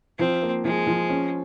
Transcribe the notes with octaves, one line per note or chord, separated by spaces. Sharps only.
F3 C4
A#3
F3 G#3
F3
C#4